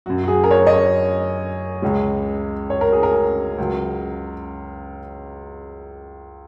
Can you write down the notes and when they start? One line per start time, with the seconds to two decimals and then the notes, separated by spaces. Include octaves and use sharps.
0.06 F#2 F#3 F#4
0.24 F#4
0.28 G#4
0.44 A#4
0.51 C#5
0.67 D#5
0.73 C#5
1.82 C#2 C#3 G#3
2.70 C#5
2.81 A#4
2.92 G#4
3.03 A#4
3.58 C#2 C#3 F#3